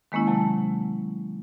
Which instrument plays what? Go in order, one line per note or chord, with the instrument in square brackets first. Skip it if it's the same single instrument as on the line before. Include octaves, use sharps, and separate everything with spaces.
[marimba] D#3 G#3 A#3 C#4 E4
C3 F#3 A5